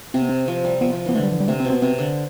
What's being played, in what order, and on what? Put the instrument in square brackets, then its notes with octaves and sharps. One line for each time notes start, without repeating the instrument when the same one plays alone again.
[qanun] C3 [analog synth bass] C4
[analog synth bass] B3
C4
[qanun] F3
G3
[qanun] F3 [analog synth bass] B3
[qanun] F3
[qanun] E3 [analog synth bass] B3
[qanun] D3 [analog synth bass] A3
[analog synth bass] G3
F3
G3
[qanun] C3 [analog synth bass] A3
[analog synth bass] C4
[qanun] B2
[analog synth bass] C4
[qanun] C3 [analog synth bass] C4
[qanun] D3